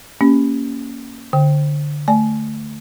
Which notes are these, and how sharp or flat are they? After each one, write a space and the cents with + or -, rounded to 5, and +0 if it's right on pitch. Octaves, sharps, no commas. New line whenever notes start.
A#3 +0 C#4 +0 G4 +0
D3 +0 G5 +0
A3 +0 D5 +0 G#5 +45